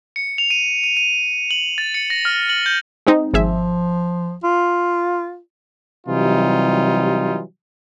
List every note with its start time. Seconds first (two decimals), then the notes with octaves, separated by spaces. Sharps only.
0.16 C#7
0.38 F7
0.50 D#7
0.84 D#7
0.97 D#7
1.51 F#7
1.78 A6
1.94 C#7
2.10 A#6
2.25 F6
2.49 F#7
2.66 G6
3.07 G#3 C4 D#4
3.33 G#1 F3 G#4 E5
4.44 F4
6.07 C3 E3 F#3 G3 D#4 F4